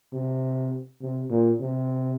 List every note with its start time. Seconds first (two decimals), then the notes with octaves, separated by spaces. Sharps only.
0.13 C3
1.02 C3
1.30 A#2
1.60 C3